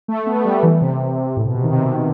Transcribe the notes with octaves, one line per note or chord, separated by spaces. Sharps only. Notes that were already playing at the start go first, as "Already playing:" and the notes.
A3
B3
A3
G3
E3
C3
A2
B2
C3
D#3
C3
B2
C3